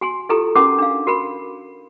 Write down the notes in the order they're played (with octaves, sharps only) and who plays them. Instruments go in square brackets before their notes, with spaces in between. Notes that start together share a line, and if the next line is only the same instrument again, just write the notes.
[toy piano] F#4 G#5 C6
E4 F4 G4 A4 A#5
C#4 E4 F#4 A#4 F#5 D6
D4 F5
F#4 A#4 B5